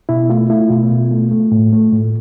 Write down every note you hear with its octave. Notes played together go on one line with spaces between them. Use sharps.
B2 E4
A3 F4
A3 E4
B2 F4
B2
A3
A3
A2
A3
A2